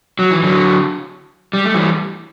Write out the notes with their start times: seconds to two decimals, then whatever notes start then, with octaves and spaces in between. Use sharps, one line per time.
0.19 F#3
0.31 E3
0.43 D3 F#3
1.53 G3
1.65 A3
1.74 E3 G3